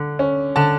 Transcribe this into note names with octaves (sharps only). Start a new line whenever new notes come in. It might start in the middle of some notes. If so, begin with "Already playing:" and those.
Already playing: D3
C#4
D3 A5